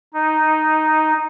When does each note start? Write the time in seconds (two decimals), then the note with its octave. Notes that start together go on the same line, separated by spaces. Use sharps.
0.14 D#4